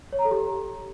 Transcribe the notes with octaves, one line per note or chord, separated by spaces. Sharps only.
C#5
A#5
A4
G4